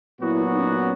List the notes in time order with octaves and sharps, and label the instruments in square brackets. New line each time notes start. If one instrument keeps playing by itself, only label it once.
[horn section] A#2 F#3 B3 F#4 [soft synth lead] E4
[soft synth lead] D#4
C#4
D#4
C#4